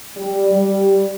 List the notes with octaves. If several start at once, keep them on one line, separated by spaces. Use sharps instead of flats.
G3
G3